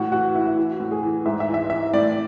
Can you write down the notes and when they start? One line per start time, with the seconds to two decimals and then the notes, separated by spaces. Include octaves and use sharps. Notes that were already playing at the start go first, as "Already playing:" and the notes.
Already playing: A2 E3 F#4
0.12 E3 F#4
0.35 E3 E4
0.46 E4
0.57 E3 F#4
0.80 A2
0.91 G#4
1.03 E3
1.26 G#2 E5
1.40 E5
1.49 E3
1.54 E5
1.70 E3 E5
1.94 A2 D5